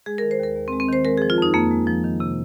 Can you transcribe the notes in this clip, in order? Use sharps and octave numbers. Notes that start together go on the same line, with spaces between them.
G#3 G#4
A#4
D#3
C5
D#2 A#4
D#2
C4
G#3
C4
D#3 C5
G#3 A#4
G#4
F3
F4
F2 D#4
F2 A#3
G#3
F3
D#3
C3